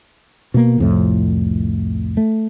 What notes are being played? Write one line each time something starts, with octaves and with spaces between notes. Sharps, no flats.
B2 A#3
C2 F2 A2
A3